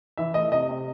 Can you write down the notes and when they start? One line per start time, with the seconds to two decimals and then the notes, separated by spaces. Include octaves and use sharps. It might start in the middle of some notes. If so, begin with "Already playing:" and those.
0.17 E3 E5
0.34 A3 D#5
0.52 C3 D#5
0.69 C3